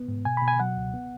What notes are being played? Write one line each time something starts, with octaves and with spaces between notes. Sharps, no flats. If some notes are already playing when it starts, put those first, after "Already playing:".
Already playing: B3
G#2
B2 G#5
B2 B5
G#5
F#3 F#5
C#2
B3